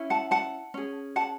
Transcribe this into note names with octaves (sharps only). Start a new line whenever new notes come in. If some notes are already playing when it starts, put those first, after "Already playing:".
Already playing: C#4 E4
F#5 A5
F#5 A5
C#4 G#4
F#5 A5